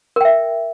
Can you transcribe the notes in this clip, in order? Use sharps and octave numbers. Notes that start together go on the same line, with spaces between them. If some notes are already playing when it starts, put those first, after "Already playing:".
A#4 E5 G5